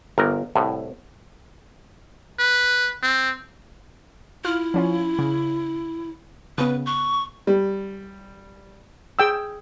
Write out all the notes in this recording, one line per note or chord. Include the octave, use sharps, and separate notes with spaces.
G1 A#4
C2 A2
B4
C4
E4 F4 F6
F3 C#4 F4
C#3
C#3 B3 B4
C#6 F#6
G3
G#4 G5 E6